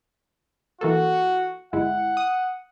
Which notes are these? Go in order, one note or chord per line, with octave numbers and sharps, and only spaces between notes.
E3 A#3 F#4 A4
G1 G#3 E4 F#5
D#6